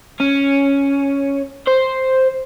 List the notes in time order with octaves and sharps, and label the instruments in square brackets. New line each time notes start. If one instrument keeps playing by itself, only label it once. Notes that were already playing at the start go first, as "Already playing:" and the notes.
[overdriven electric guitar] C#4
C5